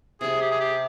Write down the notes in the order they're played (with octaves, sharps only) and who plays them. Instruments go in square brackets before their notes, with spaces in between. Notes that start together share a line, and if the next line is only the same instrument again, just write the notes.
[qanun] C3 G3 C4 [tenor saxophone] G#4
[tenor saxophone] G4
G#4
G4